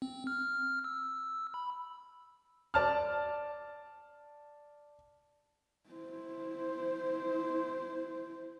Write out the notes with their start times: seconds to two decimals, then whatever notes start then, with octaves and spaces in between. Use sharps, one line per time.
0.02 C4
0.27 F6
0.84 E6
1.54 B5
2.74 D5 A5 F6
5.90 E4 C5